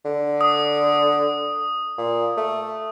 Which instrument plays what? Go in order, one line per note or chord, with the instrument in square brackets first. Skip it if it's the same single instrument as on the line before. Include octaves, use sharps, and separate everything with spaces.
[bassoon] D3
[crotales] D#6
[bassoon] A#2
A3